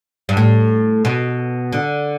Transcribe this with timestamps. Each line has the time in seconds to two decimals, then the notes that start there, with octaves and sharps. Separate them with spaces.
0.29 G2
0.37 A2
1.05 B2
1.72 D3